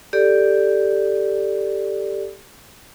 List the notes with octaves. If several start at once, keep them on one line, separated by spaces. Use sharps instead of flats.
G4 A4 D5